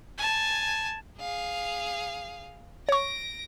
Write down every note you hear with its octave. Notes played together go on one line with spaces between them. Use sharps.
G#5 A5
G#4 F5
C#5 C#6 A#6 D7